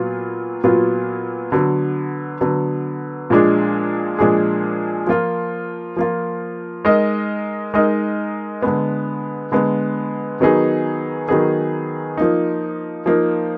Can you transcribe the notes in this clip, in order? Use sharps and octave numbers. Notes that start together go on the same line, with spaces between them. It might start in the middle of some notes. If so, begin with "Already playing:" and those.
Already playing: A#2 F#3 B3 F4
A#2 F#3 B3 F4
D3 F#3 B3
D3 F#3 B3
A#2 F3 G#3 D4 G#4
A#2 F3 G#3 D4 G#4
F3 A#3 F4
F3 A#3 F4
G#3 D#4 A#4 D#5
G#3 D#4 A#4 D#5
D3 G#3 B3
D3 G#3 B3
D#3 F#3 B3 D#4 G#4
D#3 F#3 B3 D#4 G#4
F3 A#3 D#4
F3 A#3 D#4